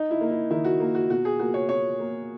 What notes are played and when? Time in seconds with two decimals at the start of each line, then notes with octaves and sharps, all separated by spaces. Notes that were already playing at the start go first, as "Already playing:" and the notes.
Already playing: D#4
0.11 E4
0.21 A#3
0.30 E4
0.50 D#3 E4
0.65 F#4
0.80 A#3
0.95 F#4
1.09 B2 F#4
1.25 G#4
1.39 A#3 F#4
1.54 C#5
1.69 B2 C#5
1.99 A#3